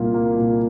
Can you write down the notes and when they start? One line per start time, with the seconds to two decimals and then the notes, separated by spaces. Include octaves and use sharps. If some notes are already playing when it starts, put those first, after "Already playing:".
Already playing: C2 A#2 A#3 F4
0.14 A#3
0.36 A#2